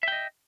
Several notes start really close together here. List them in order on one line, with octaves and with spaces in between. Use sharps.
E5 G5 D#5